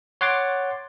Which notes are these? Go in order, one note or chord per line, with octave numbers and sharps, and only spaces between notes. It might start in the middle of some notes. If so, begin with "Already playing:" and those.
C#5 F#5 C6 D6 A6